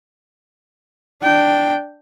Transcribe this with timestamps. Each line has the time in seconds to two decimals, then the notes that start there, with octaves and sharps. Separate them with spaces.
1.22 D4 G5